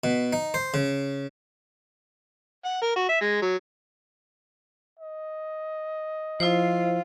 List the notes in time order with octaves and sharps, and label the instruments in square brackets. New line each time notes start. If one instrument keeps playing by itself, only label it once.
[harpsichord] B2
D#4
C5
C#3
[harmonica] F#5
A#4
F#4
E5
G#3
F#3
[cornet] D#5
[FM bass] F3 [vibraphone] E4 C5 [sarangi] F4